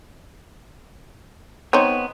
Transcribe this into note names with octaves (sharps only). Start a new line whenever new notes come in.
B3 C4 D#4 C#5